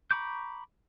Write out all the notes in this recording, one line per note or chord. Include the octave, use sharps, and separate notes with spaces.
A#5 B5 C#6 D6 G6